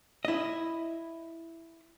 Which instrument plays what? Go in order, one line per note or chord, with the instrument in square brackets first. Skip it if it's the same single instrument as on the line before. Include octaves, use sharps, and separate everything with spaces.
[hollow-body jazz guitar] E4 D#5